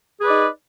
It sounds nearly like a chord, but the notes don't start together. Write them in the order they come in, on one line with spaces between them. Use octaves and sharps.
G#4 B4 D5 D#4